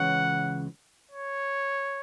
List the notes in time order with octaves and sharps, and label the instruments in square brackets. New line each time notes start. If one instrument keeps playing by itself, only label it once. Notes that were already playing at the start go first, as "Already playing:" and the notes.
Already playing: [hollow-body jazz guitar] C#2 C#3 E3 [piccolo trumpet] F#5
[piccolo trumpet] C#5